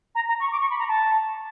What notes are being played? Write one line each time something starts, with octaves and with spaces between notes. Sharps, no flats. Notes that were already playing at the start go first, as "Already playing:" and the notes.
A#5
A#5
C#6
D6
C#6
B5
A#5
A5